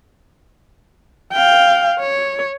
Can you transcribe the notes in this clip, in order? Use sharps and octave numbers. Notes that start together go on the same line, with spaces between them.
F5 G5
C#5